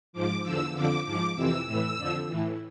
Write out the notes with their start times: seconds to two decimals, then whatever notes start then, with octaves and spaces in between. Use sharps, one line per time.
0.13 G#2 F3 D6
0.43 E2 D3 F3 E6
0.74 F2 D3 F3 D6
1.04 G#2 F3 D6
1.35 F2 C3 E3 E6
1.65 A2 E3 E6
1.97 F2 D3 F3
2.27 A2 E3